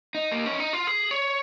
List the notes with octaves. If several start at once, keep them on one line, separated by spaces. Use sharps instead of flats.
D#4
A#3
C#4
D#4
F4
G#4
C#5